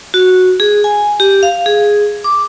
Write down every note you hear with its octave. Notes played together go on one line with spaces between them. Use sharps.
F#4
G#4
G#5
G4
F5
G#4
D6